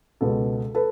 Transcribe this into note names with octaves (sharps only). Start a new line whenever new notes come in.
C#2 B2 G#3 A4 B4
A4 B4